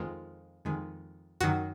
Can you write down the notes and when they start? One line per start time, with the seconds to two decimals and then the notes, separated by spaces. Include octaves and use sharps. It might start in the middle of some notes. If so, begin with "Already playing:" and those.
Already playing: F2 D#3 G#3 F4
0.65 F2 D#3 G#3
1.40 F#2 D#3 F#3 F#4